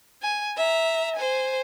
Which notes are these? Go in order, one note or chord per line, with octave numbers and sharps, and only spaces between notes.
G#5
E5 A#5
C5 G#5